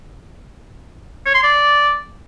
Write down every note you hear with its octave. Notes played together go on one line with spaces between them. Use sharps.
C#5
C6
D5